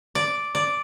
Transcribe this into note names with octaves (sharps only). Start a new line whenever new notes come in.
D5
D5